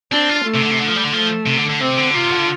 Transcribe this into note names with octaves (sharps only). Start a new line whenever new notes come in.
C4 D4
F4
A3
C3
D3
C3
D3
F3
G3
D3
F3 A3
C3
D3
D3
C3 C4
D3
C3 F4
D3